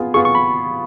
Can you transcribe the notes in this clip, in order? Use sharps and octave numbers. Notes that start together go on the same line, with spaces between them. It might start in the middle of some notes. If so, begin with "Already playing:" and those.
Already playing: B3 F4 G#4
B3 F4 G#4 C#6
C#6
B5